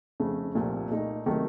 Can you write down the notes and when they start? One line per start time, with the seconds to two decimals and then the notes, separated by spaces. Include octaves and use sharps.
0.20 F2 C#3 A3
0.55 C2 A#2 F3 A3
0.90 A#2 A3 D#4
1.26 C3 D#3 F#3 A3